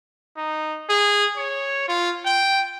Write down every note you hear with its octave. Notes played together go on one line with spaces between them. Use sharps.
D#4
G#4
C#5
F4
G5